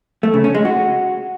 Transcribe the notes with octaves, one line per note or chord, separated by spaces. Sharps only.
A3
C#3
C#4
G#3
F#4